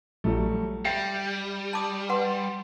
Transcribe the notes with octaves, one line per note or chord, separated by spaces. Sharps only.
A#1 F#3 G3 A3
G3 E5 G5 A6 C7
A5 D6 D#6
B4 F#5 C6